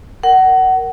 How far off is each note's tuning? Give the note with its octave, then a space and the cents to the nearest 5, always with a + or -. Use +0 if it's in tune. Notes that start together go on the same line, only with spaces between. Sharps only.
A#4 +0 F#5 +25